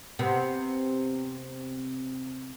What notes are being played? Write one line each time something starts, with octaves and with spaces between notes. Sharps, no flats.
C3 B3